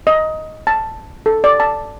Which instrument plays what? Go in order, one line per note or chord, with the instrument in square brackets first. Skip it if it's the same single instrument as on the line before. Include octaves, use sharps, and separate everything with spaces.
[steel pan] D#5
A5
A4
D5
A5